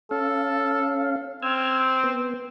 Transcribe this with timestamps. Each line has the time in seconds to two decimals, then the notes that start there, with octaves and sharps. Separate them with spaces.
0.11 C#4 A4 F5
1.42 C4 E6 F6 G#6
2.04 B3